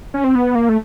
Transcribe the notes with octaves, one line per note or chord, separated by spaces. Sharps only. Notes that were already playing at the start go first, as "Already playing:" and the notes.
C#4
C4
B3
A#3
A3